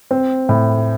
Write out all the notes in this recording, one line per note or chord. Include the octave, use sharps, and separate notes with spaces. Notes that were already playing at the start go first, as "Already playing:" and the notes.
C4
A2